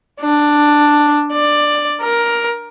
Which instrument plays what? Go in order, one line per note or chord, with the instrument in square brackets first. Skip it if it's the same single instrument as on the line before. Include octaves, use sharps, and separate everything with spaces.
[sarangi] D4
D5
A#4